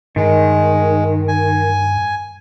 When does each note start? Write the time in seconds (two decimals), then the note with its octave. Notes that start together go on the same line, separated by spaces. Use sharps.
0.16 G2 D#3 G#3
1.28 G#5